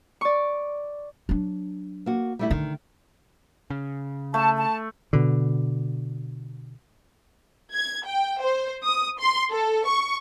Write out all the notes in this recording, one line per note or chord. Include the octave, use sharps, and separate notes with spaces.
D5 C#6
F#3 D4
A#3 F#4
G3 A3 E4
D3 D#3
C#3
A3 A5
A5
B2 D3
G#6
G5
C5
D#6
C6
A4
C#6